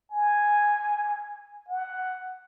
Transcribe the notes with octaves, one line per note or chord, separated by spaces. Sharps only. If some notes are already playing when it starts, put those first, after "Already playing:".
G#5
F#5